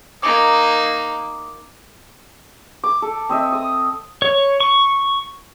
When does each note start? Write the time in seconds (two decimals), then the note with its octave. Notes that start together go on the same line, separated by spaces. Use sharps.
0.22 A#3 D#4 D6 D#6
2.84 D6
3.02 A4
3.29 C4 D#5 E5
3.53 D#6
4.22 C#5
4.60 C#6